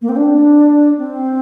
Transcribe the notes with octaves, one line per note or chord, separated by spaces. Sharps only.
A#3
C4
D4
C4